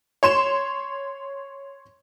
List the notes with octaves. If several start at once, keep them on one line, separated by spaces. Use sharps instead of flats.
C#5 C6 E7